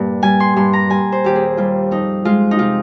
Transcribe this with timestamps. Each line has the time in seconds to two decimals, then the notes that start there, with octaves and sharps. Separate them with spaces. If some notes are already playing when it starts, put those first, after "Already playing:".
Already playing: G2 A#2
0.23 G3 G#5
0.40 C6
0.56 G2 C6
0.73 A#5
0.90 G3 G#5
1.12 C5
1.24 D#2 G4
1.36 G#4
1.57 G3 F4
1.91 F2 D#4
2.25 G#3 F4
2.51 D#4
2.59 C3 F4